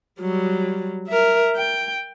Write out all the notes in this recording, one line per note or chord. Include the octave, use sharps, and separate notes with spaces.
F#3 G3
A#4 E5
G5